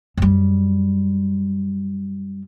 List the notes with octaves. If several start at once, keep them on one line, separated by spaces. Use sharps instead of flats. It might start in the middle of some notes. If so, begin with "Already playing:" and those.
F#2 G3